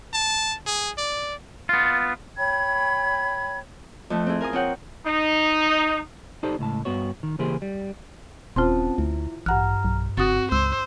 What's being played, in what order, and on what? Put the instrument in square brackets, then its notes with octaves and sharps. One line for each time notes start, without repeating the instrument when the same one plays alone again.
[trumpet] A5
G#4
D5
[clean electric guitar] B3 F4
[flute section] C#5 G5 B5 G#6
[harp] F2 A3
C4 E4 G#4
A#4 F5 G#5 D#6
C4 F4 C#5 F#5 G5
[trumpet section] D#4
[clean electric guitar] D#4 G4 A4 C5 D5
C#2 A2 A5
G2 B3 F#4 C#5
D#3
C#3 E3 A#3 G4 G#4 C5
G3
[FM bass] D#1 [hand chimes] C4 C#4 A5 [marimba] F4 C5 C6
[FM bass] D2 [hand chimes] E4
[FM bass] A1 [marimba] G2 F#5 F#6 [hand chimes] A#5 F6
[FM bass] B1
[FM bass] F#1 [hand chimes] C4 [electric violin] F#4 [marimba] D#6 A6
[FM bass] C#2 [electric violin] C5 [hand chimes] E6